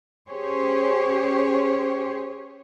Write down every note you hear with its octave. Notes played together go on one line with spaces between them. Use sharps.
C#4 G4 G#4 C5 C#5